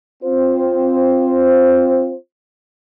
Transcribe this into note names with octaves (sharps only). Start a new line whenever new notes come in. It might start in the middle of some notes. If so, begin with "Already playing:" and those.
C4 F4 C5